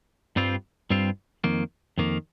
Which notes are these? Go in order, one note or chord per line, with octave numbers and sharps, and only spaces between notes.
G2 G3 C4 F4
G2 G3 C4 F4
F2 D#3 A#3
F2 D#3 A#3